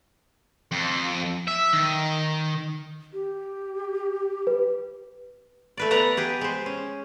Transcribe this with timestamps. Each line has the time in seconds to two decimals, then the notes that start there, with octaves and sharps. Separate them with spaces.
0.72 F2
1.48 E5
1.73 D#3
3.13 G4
4.47 B4
5.77 A3 B4 D5
5.91 B3 B4 D5 F#5 A#5
6.17 G4 G#4 B4
6.41 G#3 C5
6.66 C#4